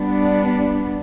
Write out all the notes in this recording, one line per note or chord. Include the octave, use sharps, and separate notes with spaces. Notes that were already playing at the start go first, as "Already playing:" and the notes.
Already playing: G3 B3 D4